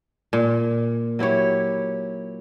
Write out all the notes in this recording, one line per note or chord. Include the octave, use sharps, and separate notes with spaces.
A#2
F#3 E4 G4 C#5